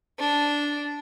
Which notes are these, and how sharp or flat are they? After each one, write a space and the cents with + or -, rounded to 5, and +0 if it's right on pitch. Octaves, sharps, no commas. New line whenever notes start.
D4 -10